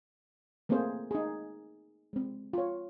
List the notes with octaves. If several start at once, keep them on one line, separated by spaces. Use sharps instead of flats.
A3 A#3 C4 E4 G#4 C5
D#4 G#4
G#3 C4
F4 C#5